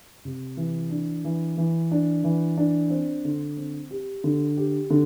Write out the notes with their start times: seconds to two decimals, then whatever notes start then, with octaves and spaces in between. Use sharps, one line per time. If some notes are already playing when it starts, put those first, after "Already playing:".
0.25 C3
0.57 E3
0.90 D4
1.25 E3
1.57 E3
1.91 D4
2.24 E3
2.58 D4
2.90 C4
3.25 D3
3.57 C4
3.91 G4
4.24 D3
4.58 G4
4.90 D3